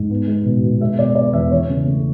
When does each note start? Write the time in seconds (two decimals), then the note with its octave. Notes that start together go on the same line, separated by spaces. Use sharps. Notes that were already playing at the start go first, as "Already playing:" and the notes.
Already playing: G#2
0.10 B3
0.27 G#3
0.46 B2
0.63 B2
0.80 G#3 E5
0.99 B2 D5
1.15 B3 D5
1.33 E2 E5
1.51 E3 C#5
1.69 C#3
1.87 A3